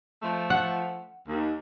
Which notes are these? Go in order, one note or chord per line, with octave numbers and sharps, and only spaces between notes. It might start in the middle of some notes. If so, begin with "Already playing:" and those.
F3 A3
F#5
D#2